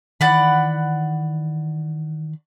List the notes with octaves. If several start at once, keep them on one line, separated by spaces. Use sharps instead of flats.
D#3 E3 D5 F#5 B5